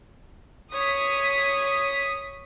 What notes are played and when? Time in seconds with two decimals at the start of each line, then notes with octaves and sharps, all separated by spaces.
0.73 C#5 D#6 B6